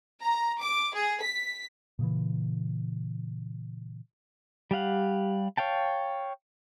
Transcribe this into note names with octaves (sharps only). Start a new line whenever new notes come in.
A#5
D6
G#4
B6
A#2 C#3 E3
G3 G4 F5 F#5
C#5 F5 G5 A5